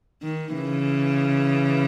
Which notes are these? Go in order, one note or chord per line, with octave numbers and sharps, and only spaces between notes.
D#3
C#3 E3